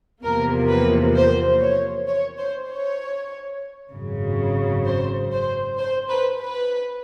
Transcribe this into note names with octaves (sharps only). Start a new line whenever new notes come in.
E2 C3 F3 A#3 A#4
B4
C5
C#5
C#5
C5
C#5
G#1 F#2 C#3
C5
C5
C5
B4
B4